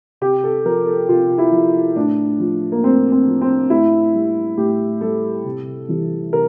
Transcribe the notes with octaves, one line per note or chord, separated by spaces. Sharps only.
C3 G4
A4
F3 A#4
A4
C3 F4
E4
F3
A2 D4
F3
A#3
A2 C4
C4
F3
C4
A2 E4
G3
A2 G4
G3 A4
C3
E3 G3
C3 A#4